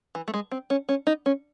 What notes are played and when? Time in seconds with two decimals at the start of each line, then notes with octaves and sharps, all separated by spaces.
0.15 E3
0.28 A3
0.34 G#3
0.51 C4
0.70 C#4
0.89 C#4
1.07 D#4
1.26 C#4